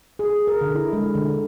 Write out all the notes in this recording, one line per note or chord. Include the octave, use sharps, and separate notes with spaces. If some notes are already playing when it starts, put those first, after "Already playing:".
G#4
A#4
D3
E4
G#3
D3